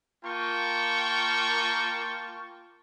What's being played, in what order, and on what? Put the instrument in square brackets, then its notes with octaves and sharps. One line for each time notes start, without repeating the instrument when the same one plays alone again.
[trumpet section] A#3 F4 A#4 G5 A5 C#6